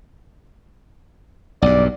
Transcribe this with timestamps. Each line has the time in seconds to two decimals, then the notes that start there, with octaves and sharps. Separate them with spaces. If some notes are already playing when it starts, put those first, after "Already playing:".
1.62 B1 G2 D5